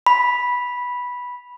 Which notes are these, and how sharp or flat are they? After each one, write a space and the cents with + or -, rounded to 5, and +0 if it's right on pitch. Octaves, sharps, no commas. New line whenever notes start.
B5 -10